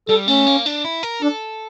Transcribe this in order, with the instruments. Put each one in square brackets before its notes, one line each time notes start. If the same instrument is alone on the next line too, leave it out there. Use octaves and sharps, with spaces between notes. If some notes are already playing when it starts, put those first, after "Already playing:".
[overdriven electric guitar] G3 [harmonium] A4
[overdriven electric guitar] A3 [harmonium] C#4
[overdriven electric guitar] A#3
D4
E4
A#4
[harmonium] D4 [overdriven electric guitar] A4